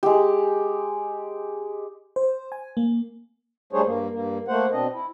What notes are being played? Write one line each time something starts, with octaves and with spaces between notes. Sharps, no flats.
G#3 G4
C5
G#5
A#3
G3 A3 D4 G#4 C5 C#5
G2 A#3
G2 A#3
A3 A#3 C5 F#5
B2 C4 D4 D#5
E4